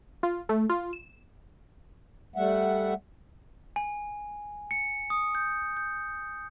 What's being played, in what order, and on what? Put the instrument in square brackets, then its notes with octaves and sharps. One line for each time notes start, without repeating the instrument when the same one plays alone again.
[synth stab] F4
A3
F4
E7
[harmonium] G3 A3 E5 F#5
[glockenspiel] G#5
C#7
D#6
G6
G6